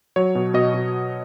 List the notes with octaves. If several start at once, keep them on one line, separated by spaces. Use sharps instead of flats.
F#3 C#5
B2
B2 D#5
B2